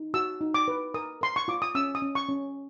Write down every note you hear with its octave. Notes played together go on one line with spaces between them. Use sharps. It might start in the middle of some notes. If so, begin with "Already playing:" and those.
Already playing: D#4
F#4 E6
D#4
D6
B4
A#4 D#6
A#4 C6
C#6
F4 D6
D#6
C#4 E6
D#6
C#4
C#6
C#4